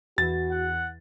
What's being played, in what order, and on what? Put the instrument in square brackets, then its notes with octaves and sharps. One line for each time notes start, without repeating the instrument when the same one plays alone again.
[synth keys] E2 E3 [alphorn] F#4 [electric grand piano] A6
[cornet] F#5